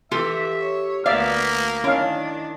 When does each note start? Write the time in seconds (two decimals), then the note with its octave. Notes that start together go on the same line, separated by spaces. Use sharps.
0.11 E3 F4 G4 A4 E5
0.60 C#5
1.06 D2 A#3 B3 D5 E5 F5
1.84 D#3 C#4 D4 E4 F5